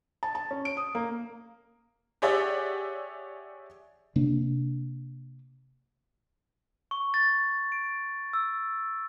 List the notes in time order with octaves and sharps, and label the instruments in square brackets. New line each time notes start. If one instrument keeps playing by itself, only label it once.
[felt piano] A5
A5
C#4
D7
D#6
A#3
[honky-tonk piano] G4 G#4 C#5 D5 E5 F#5
[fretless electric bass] C3 A#3 D4
[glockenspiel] C#6
A6
D7
E6